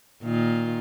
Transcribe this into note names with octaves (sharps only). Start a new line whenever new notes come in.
A#2 D#3 F4